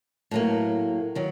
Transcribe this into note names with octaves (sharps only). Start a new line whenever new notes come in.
A2 F#3 A#3
D#3 F#3